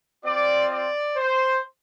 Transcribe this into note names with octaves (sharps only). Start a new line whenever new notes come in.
C4 F4 D5
D5
C5